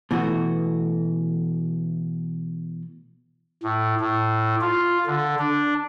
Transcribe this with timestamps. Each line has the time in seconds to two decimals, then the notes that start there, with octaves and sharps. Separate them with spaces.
0.11 B2 E3 A3 F#4
3.64 A2
4.01 A2
4.61 F4
5.06 D3
5.39 D4